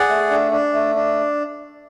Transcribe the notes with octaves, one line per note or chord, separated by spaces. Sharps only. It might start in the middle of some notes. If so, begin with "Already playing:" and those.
Already playing: G#4 D5 F#5
A3
D4
D4
A3
D4